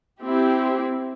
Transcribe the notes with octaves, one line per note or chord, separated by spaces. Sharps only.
C4 E4 G4